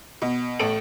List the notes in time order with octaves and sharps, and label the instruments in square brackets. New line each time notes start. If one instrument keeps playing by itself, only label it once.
[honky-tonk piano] B2
A1 A2 A4 D7 F#7